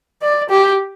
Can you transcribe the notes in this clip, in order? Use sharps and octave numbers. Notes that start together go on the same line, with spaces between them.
D5
G4